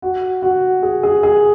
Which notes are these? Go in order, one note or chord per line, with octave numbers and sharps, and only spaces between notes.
F#4
F#4
G#4
G#4
G#4